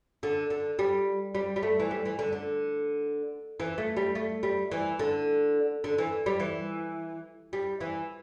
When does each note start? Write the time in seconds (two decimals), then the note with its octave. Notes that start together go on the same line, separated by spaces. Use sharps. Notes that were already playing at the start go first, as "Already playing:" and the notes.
0.23 D3
0.50 D3
0.79 G3
1.35 G3
1.56 G3
1.63 A3
1.80 E3
1.91 G3
2.05 E3
2.19 D3
2.33 D3
3.60 E3
3.78 A3
3.97 G3
4.15 A3
4.43 G3
4.72 E3
4.99 D3
5.84 D3
5.98 E3
6.26 G3
6.40 E3
7.53 G3
7.80 E3